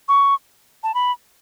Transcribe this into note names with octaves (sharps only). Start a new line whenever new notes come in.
C#6
A5
B5